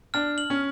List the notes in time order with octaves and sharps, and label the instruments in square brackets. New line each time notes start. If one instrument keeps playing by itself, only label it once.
[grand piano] D4 [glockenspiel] F6
[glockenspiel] F#7
[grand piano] C#4